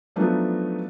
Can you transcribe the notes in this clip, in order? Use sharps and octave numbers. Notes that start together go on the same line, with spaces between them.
F3 F#3 A3 B3 D4 D#4